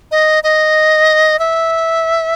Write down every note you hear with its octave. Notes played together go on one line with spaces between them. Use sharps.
D#5
D#5
E5